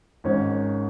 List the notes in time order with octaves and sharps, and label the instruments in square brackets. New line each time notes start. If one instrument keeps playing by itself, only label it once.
[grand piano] G#1 G#2 D#3 C#4